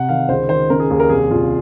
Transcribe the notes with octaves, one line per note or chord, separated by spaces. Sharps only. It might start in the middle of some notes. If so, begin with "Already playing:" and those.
Already playing: C3 F#5
D#3 F5
C#2 C5
D#3 C5
C#3 A#4
G#4
D#2 G#4
A#4
C2 G#4
C2 F4